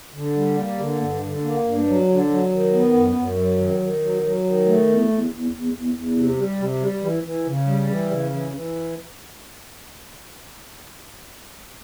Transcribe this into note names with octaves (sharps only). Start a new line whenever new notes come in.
D3
G3
A#3
D3
G2
D3
A#3
G2
F#3
D3
F#3
D#3
B3
F#2
F#2
F#3
D#3
D#3
F#3
F#3
D#3
A3
E2
E2
E2
E2
E2
E2
C3
G3
C3
G3
E3
E3
C#3
G3
E3
C#3
E3
E3